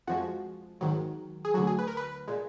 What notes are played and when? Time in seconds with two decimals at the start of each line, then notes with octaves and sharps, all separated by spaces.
0.07 F2 F3 G#3 F#4
0.81 G#1 G#2 D#3 F#3
1.45 G#4
1.54 D2 D3 F#3 F#4
1.67 G#4
1.79 B4
1.87 A#4
1.97 B4
2.28 A#2 G#3